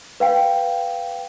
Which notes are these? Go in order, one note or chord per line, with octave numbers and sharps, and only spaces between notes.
B4 F5 G5